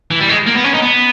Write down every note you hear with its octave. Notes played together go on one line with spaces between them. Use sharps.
E3
G3
G#3
A#3
B3
C#4
D#4
B3